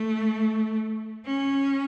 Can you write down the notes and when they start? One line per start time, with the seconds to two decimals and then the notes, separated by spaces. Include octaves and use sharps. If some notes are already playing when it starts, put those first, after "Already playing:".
Already playing: A3
1.26 C#4